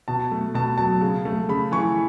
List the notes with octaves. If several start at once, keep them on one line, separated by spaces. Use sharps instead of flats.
B2 A5
A3
B2 A5
F#3 A5
C#3
A3
C#3 B5
E3 C#6